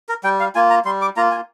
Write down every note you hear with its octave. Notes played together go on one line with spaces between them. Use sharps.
A#4
G3 G5
F5
A#3 F4 G#5
A#5
G3 C6
D6
A#3 F4 A#5
G#5